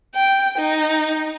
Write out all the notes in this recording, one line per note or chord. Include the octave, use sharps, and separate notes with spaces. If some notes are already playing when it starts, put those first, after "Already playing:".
G5
D#4